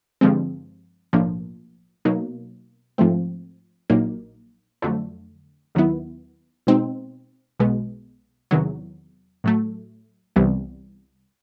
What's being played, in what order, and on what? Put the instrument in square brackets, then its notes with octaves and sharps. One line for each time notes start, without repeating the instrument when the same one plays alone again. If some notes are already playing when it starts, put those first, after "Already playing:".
[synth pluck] G2 D3 F3 G#3 C4
B1 A2 F3 A#3 D4
B2 F#3 A#3 D#4
G#2 F3 A3 C4
A#1 A#2 F#3 A#3 D#4
F2 D3 F#3 A3
D#2 D#3 F#3 B3 E4
B2 G#3 C4 D#4
B1 B2 G#3 B3
E2 C3 D#3 F#3
A2 F#3 A3
C2 C3 E3 G3 B3